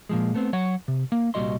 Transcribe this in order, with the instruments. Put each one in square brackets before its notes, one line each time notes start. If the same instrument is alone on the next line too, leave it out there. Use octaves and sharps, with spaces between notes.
[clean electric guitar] A#2 F3 G#3
A3 B3 C4
F#3 C#5 F#5
C3
A#3
C2 A#2 G3 F#4 D#5 C6